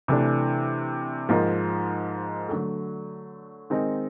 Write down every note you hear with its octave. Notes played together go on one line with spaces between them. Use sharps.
C3 E3 A3 D4
G#2 F3 A#3 D#4
D3 F#3 A3
D#3 G#3 C4 D#4